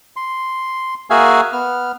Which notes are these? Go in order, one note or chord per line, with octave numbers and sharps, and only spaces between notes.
C6
A#3 F#4 G#4 E5 F5 G#5
B3 F6